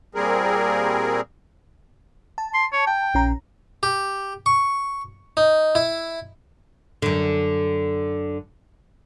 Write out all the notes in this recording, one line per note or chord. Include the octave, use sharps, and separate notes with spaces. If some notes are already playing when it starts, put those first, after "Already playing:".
A#2 G3 C4 G#4 A#4
A5
C6
C#5
G5 A5
A#1 C#4 A#5
G4
C#6
D#4
E4
F#2 D3